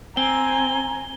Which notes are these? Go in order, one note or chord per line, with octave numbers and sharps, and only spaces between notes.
C4 G#5 A#5 G7